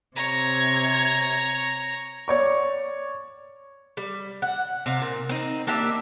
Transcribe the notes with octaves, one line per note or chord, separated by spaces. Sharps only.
C3 C#5 A#5 G#6
C#5 D5 C#6
G3
F#5
C3 F5
A#2
C4 D#4
A#3 D4 G4 E5